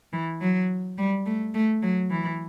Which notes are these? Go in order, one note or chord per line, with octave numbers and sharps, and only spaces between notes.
E3
F#3
G3
A3
A3
F#3
E3